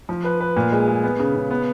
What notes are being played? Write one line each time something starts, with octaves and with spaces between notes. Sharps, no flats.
F3
B4
B4
A#2
G#3
G#3
B3
C#3
C#3
B3